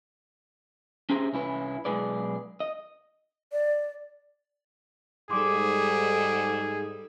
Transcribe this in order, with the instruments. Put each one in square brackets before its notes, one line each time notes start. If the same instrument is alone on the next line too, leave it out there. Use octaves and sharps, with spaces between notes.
[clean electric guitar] C#4 G4 G#4 C5 E5 A#5
C2 C#4 E4 F#4 B4
B1 F#2 G#3 G#4 B4 D5
D#5
[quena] D5
[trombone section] G#2 [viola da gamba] G3 A4 [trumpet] G#4 [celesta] C6 D6